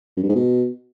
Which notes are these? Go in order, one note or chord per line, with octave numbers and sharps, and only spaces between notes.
F#2
G2
G#2
B2